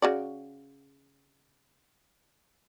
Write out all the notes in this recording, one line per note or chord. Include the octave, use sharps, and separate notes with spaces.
C#3 F#4 D5